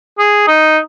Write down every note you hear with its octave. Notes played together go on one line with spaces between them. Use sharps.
G#4
D#4